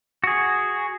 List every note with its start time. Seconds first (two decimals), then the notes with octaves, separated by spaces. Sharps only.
0.24 F#4 G#4